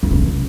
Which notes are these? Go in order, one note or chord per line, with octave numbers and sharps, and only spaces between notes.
D#3
C#3